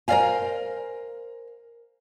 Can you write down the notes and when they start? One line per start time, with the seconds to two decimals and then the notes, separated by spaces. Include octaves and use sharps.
0.08 A#4 C5 D5 E5 F5 G#5